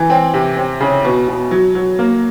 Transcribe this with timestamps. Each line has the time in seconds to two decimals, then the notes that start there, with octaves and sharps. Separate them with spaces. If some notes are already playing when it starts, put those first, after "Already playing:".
Already playing: E3
0.10 C4
0.34 C3
0.57 C4
0.81 C#3
1.05 B2
1.28 B2
1.51 F#3
1.75 F#3
1.99 A#3